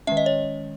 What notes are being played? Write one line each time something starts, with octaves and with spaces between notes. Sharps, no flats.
D#3 G#3 C#4 E5
D#5
C#5